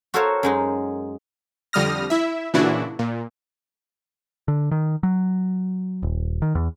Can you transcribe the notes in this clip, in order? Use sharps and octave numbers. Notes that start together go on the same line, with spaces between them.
F#4 A4 A#4 C5 C#5 F5
F#2 G#3 D#4
F2 D3 G3 D#6 F6 A#6
E4 E5
A#2 C#3 E3 D4 E4 F#4
A#2
D3
D#3
F#3
D#1
D#3
E2